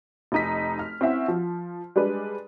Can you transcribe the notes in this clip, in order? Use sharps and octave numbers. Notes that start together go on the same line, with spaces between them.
F1 D#4 B6
F6
C4 C#4 E4 E5 F#5
F3
G3 G#3 D4 B4